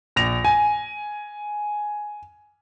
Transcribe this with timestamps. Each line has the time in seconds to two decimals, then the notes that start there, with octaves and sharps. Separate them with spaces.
0.16 A#1 A#6 F7
0.45 G#5